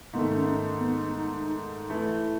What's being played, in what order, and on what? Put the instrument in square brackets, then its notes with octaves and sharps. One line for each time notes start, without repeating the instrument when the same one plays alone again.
[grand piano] G#2 D#3 A3 [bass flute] B3
[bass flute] C#4
B3
D#4
[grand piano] E3 A3 E4